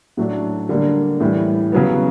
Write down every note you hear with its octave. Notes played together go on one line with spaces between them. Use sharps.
A2 F#3 A3 D4
D3 G3 A#3
A2 E3 G3
C#3 F#3 B3